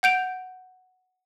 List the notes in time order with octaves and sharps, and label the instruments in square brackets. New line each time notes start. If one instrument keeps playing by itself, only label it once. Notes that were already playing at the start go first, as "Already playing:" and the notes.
[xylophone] F#5 G6 D7 F7